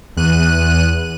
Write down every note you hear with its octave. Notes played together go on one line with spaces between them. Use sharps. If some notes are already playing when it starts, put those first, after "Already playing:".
E2 F#6 D#7